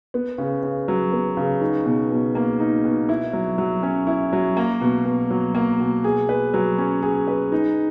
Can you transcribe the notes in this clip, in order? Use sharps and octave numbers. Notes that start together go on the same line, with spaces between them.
B3
C#3
C#3
F#3
B3
C#3
D#4
B2
B2
A#3
D#4
B2
E4
F#3
F#3
C#4
E4
F#3
A#3
B2
B2
F#3
A#3
B2
G#4
B4
F#3
C#4
G#4
B4
D#4